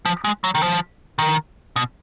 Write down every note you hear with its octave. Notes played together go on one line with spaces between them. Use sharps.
F3
G#3
F#3
D#3
F3
D#3
B2